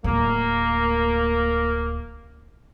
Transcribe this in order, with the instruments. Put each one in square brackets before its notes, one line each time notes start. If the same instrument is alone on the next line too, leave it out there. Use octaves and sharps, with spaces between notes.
[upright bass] D1 D2 [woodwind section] A#3